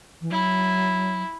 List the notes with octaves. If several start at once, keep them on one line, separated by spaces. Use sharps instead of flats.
E3
F#3 E4